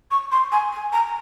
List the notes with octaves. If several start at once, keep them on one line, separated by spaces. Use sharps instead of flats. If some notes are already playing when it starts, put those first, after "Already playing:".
C#6
C6
G#5
G#5
A#5